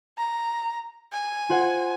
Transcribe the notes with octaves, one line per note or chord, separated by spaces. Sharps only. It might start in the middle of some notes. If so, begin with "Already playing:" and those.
A#5
G#5
F4 C5 F#5